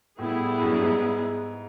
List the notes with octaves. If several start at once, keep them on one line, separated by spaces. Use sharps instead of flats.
A2 G3 B3 E4 G#4
F#2
G2
G#2